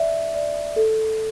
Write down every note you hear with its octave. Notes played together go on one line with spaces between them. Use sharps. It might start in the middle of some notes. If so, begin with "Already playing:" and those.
Already playing: D5 E5
D5
A4